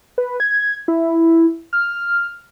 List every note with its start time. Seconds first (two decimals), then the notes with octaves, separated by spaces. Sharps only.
0.18 B4
0.40 G#6
0.88 E4
1.73 F6